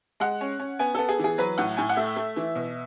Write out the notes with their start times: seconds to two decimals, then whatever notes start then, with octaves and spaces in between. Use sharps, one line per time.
0.20 G#3 F#5
0.41 C#4
0.59 C#4
0.79 B3 G#5
0.95 B3 A4
1.09 G#4
1.19 E3
1.24 G#4
1.38 F#3 B4
1.58 A2 F#5
1.77 A2 G#5
1.89 F#5
1.97 A3 E5
2.16 A3
2.36 E3
2.55 B2